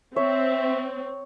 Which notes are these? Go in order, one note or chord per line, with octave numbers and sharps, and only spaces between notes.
C4 C#5 E5